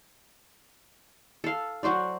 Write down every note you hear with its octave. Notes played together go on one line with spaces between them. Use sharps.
A4 F5
F#3 F#4 C5 D5